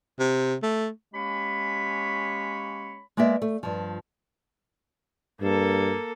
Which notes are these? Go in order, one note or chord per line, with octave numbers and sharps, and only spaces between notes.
C3
A3
G#3 A#3 C#4 G4 C#5 B5
G#3 A#3 B3 D5 E5
A3
G2 F3
G2 A#3 A4